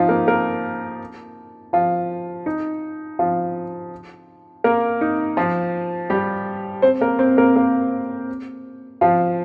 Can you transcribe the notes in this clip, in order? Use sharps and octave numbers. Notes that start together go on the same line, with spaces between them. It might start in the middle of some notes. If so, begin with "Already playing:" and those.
Already playing: F3 D#4 F4
A#3 A#4
A#3 A#4
F3 F4
D#4
F3 F4
A#3 A#4
D#4
F3 F4
G3 G4
C4 C5
A#3 A#4
C4 C5
A#3 A#4
A#3 A#4
F3 F4